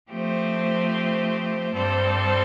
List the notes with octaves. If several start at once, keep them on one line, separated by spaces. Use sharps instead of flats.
F3 A3 C4 G4 C5
G2 G3 C4 A4 C5